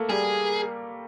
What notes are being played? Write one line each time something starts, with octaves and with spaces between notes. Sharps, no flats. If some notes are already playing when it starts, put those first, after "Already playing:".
Already playing: A3 A#3
G3 G#4